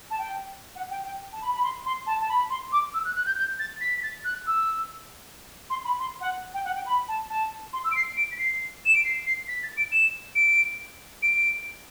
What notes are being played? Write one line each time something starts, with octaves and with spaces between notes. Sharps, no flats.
A5
G5
F#5
G5
G5
A5
B5
B5
C6
C6
A5
A5
B5
C6
D6
E6
F#6
F#6
G6
G6
A6
B6
B6
A6
F#6
E6
C6
B5
C6
F#5
G5
F#5
G5
B5
A5
A5
C6
E6
D7
C7
D7
B6
C7
E7
D7
C7
C7
B6
A6
D7
E7
D7
D7